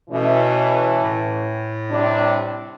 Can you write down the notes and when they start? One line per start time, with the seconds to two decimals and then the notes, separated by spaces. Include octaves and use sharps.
0.10 B2 E3 A3 C#4
1.03 A2
1.90 C3 G3 D4